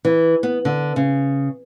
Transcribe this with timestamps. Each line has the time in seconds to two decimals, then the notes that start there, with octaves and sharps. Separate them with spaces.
0.05 E3
0.43 B3
0.65 D3
0.96 C#3